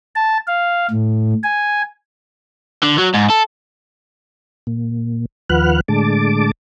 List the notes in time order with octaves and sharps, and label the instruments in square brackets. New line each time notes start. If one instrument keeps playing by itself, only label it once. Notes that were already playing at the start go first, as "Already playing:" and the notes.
[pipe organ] A5
F5
A2
G#5
[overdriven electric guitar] D3
F#3
G#2
A4
[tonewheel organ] A#2
D#2 F3 B4 F#5 F6 F#6
A2 D3 G#3 A5 D6